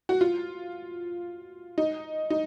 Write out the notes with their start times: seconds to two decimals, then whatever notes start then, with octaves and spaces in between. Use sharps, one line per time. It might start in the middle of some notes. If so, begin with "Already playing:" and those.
0.09 F#4
0.21 F4
1.78 D#4
2.30 D#4